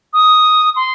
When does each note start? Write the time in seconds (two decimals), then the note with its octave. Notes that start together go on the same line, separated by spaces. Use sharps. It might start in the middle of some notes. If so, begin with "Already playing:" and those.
0.13 D#6
0.76 C6